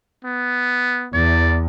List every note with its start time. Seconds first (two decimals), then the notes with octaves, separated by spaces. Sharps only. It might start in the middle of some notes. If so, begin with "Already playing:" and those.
0.25 B3
1.14 E2 D5